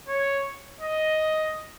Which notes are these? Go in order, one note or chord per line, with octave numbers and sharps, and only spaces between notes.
C#5
D#5